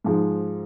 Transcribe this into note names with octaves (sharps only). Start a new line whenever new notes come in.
G#2 F3 G#3